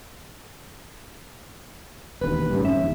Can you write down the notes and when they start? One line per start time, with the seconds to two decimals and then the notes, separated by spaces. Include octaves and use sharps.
2.21 E1 D#2 B4
2.50 G#2 C#3 G3
2.65 F2 G#2 C#4 E5
2.80 E1 D#2